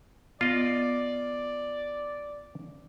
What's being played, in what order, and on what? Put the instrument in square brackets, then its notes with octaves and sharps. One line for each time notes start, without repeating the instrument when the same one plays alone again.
[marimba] B3 [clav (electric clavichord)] F4 D#5 [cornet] D5